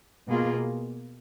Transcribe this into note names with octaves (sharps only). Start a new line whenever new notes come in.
B2 A#3 F4 G#4